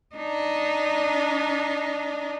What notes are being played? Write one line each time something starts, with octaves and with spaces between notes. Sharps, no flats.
D4 D#4